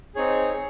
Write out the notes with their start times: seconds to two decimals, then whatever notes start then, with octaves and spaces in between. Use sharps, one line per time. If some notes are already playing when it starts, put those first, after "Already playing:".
0.15 C4 D#4 G#4 C#5
0.54 G#4